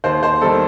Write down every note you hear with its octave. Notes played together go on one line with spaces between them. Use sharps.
D#2 C5
C5
D#3 G3 A4